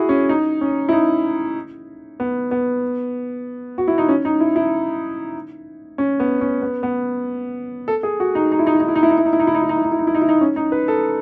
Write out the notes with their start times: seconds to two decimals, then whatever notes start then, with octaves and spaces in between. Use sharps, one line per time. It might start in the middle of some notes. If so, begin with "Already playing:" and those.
Already playing: E4 F#4 G#4
0.09 C#4
0.29 D#4
0.61 C#4
0.89 E4
0.92 D#4
2.20 B3
2.51 B3
3.78 F#4
3.88 E4
3.98 D#4
4.09 C#4
4.25 D#4
4.40 E4
4.56 E4
5.98 C#4
6.20 B3
6.41 C#4
6.62 B3
6.83 B3
7.88 A4
8.03 G#4
8.20 F#4
8.35 D#4
8.52 D#4
8.59 E4
8.67 D#4
8.73 E4
8.80 D#4
8.88 E4
8.96 D#4
9.03 E4
9.10 D#4
9.18 E4
9.25 D#4
9.33 E4
9.40 D#4
9.47 E4
9.55 D#4
9.62 E4
9.69 D#4
9.77 E4
9.84 D#4
9.92 E4
9.99 D#4
10.07 E4
10.15 D#4
10.22 E4
10.29 D#4
10.41 C#4
10.56 D#4
10.72 B4
10.88 A4